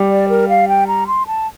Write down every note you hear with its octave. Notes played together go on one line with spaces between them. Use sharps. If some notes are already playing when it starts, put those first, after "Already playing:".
Already playing: G3
D5
A#4
F5
G5
A#5
C6
A5